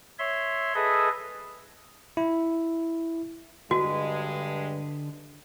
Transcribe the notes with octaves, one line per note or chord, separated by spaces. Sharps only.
C#5 E5 C6
G#4 A4 B4 D#5 E5
E4
G2 D3 G#3 F#4 B4